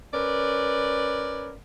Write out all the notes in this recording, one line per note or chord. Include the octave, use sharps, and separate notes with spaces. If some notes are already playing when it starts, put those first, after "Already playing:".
C#4 A#4 B4 D5